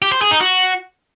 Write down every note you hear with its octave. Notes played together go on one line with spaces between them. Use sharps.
G4
C5
G#4
D#4
F#4